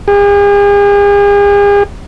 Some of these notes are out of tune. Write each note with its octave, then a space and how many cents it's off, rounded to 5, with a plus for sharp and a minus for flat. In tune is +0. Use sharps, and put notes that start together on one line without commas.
G#4 -45